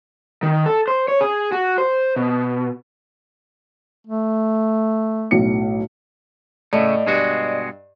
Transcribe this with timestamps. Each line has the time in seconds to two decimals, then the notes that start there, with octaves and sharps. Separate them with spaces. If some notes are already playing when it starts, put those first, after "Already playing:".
0.43 D#3
0.66 A4
0.88 C5
1.08 C#5
1.21 G#4
1.52 F#4
1.78 C5
2.16 B2
4.07 A3
5.31 B1 A2 C#7
6.73 A2 C#3 A3 D5 D#5
7.07 G2 B2 G#3 F#4